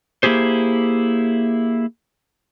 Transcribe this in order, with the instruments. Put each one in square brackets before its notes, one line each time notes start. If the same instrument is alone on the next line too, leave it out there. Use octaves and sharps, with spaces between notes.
[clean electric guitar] A#3 E4 G4 G#4 C5